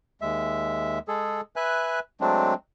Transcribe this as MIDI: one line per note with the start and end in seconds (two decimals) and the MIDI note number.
0.22 0.99 39
0.22 0.99 56
0.22 0.99 76
1.08 1.41 56
1.08 1.41 68
1.08 1.41 69
1.56 2.00 71
1.56 2.00 76
1.56 2.00 80
1.56 2.00 90
2.21 2.54 54
2.21 2.54 56
2.21 2.54 57
2.21 2.54 60
2.21 2.54 62